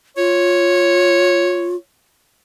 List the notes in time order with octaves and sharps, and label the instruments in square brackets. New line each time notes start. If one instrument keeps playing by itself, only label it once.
[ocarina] F4 [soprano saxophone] C#5